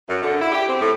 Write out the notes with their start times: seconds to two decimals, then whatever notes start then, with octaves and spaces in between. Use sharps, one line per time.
0.08 F#2
0.22 D3
0.40 E4
0.52 G4
0.68 C4
0.81 A2